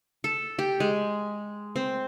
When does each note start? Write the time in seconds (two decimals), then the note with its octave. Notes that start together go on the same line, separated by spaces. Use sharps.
0.24 A4
0.59 G4
0.80 G#3
1.76 C4